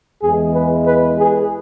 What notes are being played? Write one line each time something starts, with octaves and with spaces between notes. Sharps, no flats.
E2 E3 G#3 G#4
B4
B4
G#4